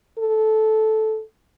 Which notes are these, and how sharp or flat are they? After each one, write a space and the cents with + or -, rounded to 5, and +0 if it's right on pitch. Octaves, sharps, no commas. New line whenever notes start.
A4 -10